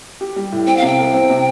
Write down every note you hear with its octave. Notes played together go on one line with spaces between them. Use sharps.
G4
G3
A2
C4 G5
F5
C3 G5
C2
C4
C3